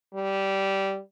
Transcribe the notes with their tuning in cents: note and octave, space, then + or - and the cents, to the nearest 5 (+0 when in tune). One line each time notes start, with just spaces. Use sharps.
G3 -10